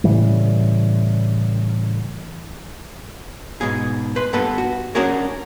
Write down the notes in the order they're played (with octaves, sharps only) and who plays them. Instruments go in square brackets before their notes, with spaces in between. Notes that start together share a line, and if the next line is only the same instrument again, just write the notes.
[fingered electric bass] A2 C#3 E3 G3
[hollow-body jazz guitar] G#2 B2 G#4
B4 C6
G2 B3 A4 B4
F#4
C#4 D4 F#4 G#4 A#4 C#5